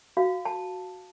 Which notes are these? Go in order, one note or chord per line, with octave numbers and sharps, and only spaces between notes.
F#4 F5
A5